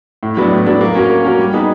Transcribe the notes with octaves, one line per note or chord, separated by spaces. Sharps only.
A2
F#3 B3 D4
A2
F#3 B3 D4
A#3
C#4 F#4 A#4
A#3
C#4 F#4 A#4
G3
B3 D#4 G#4 B4